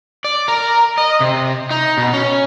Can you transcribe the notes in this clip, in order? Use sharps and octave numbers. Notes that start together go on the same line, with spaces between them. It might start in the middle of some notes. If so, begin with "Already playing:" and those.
D5
A#4
D#5
C3
D#4
B2
C#4